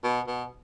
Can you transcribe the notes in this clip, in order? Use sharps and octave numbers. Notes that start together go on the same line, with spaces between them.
B2
B2